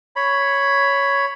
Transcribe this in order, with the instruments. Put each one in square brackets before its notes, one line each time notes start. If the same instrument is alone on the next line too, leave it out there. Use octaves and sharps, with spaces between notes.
[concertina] C#5 B5